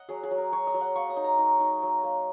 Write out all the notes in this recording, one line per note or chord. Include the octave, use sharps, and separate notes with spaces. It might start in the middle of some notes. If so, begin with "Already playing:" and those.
Already playing: D#5 F#5
F#3 G#4
G#4
F#3
A#4
F#3 C#5
D#5
F#3
F#5
A#3 C#6
D#6
D#4
A#5
D#4
D#4
F#3
A#3